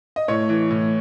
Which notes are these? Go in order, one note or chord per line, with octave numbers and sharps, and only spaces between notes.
D#5
A2 C#5
E3
A2